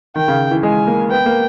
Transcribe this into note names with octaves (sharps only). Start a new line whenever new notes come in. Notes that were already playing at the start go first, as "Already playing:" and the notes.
D#3 G5
C#3
E3
G#3 G#5
A#3
B3 G5
A#3